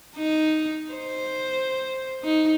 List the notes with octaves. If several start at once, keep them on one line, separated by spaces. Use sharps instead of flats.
D#4
C5
D#4